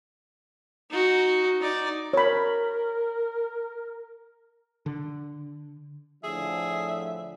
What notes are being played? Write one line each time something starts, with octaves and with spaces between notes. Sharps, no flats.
D#4 F#4
D#4 D5
A#4 C#5 B5
D3
A2 D3 F3 G#4 E5